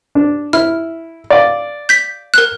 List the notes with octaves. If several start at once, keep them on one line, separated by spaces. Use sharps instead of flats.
D4
E4 F6
D5 F5
G6 B6
A#4 F#6